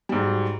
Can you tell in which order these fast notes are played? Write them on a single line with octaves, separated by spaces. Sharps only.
G3 G#2 F#3